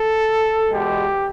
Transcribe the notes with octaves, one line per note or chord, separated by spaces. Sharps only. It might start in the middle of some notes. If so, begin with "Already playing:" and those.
Already playing: A4
E2 B2 G#3 G4